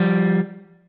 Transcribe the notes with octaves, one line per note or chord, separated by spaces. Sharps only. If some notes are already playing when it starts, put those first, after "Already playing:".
Already playing: F3 G3